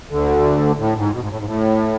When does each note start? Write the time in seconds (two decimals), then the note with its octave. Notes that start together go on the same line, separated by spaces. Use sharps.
0.10 D2 D3
0.78 A2
0.96 G#2
1.13 B2
1.21 G#2
1.30 A2
1.38 G#2
1.47 A2